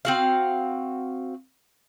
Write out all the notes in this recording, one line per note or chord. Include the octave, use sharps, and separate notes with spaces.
C4 F#4 F5